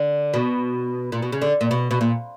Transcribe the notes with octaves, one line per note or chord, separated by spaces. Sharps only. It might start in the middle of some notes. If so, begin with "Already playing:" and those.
Already playing: D3
B2
A#2
B2
C#3
D3
A#2
B2
B2
A#2